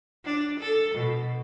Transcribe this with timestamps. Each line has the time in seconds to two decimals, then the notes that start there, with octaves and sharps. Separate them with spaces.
0.25 D4
0.60 A4
0.95 B2